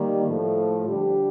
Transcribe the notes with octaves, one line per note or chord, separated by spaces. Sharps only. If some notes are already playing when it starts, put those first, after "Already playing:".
Already playing: D#3 G3 A#3
A2 F3 A3
D3 G3 D4 G4